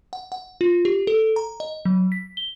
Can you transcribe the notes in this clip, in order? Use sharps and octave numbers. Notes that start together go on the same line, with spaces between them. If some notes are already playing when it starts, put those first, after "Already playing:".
F#5
F#5
F4
G4
A4
A#5
D#5
F#3
B6
G7